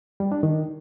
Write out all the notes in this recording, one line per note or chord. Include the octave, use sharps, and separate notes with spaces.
G3
D4
D#3